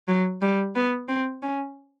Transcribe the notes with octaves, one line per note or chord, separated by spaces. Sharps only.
F#3
G3
B3
C4
C#4